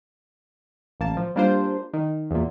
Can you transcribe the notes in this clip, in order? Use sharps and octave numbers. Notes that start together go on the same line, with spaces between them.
A1 A#3 A5
F3
G3 A#3 D4 F4 C5
D#3
E2 A#2